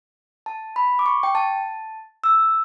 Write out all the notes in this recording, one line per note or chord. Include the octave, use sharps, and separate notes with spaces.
A5
B5
D6
C#6
G5
A5
E6